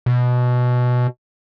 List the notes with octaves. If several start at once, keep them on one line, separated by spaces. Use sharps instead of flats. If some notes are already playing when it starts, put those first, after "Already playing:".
B2